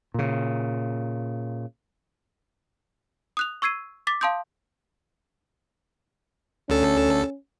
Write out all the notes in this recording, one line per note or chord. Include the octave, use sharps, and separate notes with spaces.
A#2 C#3
D#6 F#6 F7
C#6 E6 G#6 C7 D#7
D6 A6 B6
F5 A5 C6 D#6 G6
D2 C#4 A4